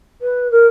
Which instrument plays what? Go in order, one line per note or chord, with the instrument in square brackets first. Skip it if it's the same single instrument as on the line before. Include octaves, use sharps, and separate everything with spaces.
[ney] B4
A#4